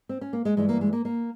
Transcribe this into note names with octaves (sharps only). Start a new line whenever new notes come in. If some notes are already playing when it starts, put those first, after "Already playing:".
C4
C#4
A#3
G#3
G2 E3 G3 G#3
A#3
G#3
A#3
A#3